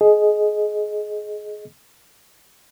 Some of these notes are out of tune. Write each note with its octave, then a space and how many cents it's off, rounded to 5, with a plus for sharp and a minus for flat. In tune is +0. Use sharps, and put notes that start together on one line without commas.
G#4 +25 D#5 +0